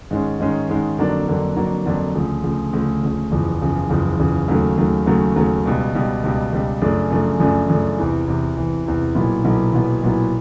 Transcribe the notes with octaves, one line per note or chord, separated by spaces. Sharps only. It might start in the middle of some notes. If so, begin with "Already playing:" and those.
G#2 D#3 G#3 C#4
G#2 D#3 G#3 C#4
G#2 D#3 G#3 C#4
F2 D3 F#3 A#3 D4
F2 D3 F#3 A#3 D4
F2 D3 F#3 A#3 D4
F2 D3 F#3 A#3 D4
D2 C#3 F3
D2 C#3 F3
D2 C#3 F3
D2 C#3 F3
F#1 E2 C#3 F3
F#1 E2 C#3 F3
F#1 E2 C#3 F3
F#1 E2 C#3 F3
D#2 C#3 F#3 A3
D#2 C#3 F#3 A3
D#2 C#3 F#3 A3
D#2 C#3 F#3 A3
C#2 B2 G3
C#2 B2 G3
C#2 B2 G3
C#2 B2 G3
F#2 C#3 F3 A3 D4
F#2 C#3 F3 A3 D4
F#2 C#3 F3 A3 D4
F#2 C#3 F3 A3 D4
E2 C3 E3
E2 C3 E3
E2 C3 E3
E2 C3 E3
B1 A#2 F#3 B3 E4
B1 A#2 F#3 B3 E4
B1 A#2 F#3 B3 E4
B1 A#2 F#3 B3 E4